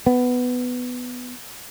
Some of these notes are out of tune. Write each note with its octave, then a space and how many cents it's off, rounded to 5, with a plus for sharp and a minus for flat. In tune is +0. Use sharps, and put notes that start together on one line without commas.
B3 +10